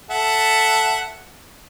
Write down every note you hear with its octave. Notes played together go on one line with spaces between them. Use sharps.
A4 E5 F#5